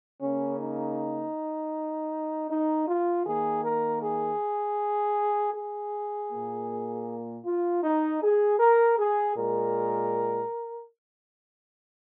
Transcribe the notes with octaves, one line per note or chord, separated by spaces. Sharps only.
C#3 A#3 C#4
D#4
D#4
F4
D#3 A#3 G#4
A#4
G#4
G#4
A#2 A#3
F4
D#4
G#4
A#4
G#4
A#2 G#3 A#4